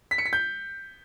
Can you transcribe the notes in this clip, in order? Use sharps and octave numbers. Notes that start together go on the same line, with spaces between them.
B6
C#7
B6
G6